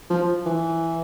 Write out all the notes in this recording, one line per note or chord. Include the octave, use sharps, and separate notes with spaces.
F3
E3